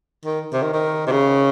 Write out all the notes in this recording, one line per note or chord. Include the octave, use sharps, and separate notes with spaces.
D#3
C3
D#3
D#3
C3
C#3